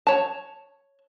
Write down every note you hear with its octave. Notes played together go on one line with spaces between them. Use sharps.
C#5 A5